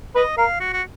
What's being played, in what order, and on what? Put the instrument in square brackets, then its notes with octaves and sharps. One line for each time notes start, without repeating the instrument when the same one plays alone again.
[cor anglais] B4 [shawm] D#5
[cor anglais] A#4 [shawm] F5
[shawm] F#4
F#4